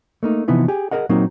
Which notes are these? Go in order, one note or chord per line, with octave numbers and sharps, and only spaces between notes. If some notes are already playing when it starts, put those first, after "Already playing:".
A3 A#3 D#4
C3 E3 F3 B3 D#4 E4
G4 G#4
G#4 A#4 D#5 F#5
A#2 F#3 A#3 C4 D#4